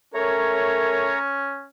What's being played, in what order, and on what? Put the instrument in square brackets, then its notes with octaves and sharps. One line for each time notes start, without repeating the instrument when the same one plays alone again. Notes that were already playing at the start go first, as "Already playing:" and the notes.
[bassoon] A3 [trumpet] C#4 [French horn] A#4 [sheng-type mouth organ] C#5 A#5